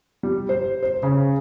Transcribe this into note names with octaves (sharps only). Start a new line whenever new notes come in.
G3
C5
C5
C#3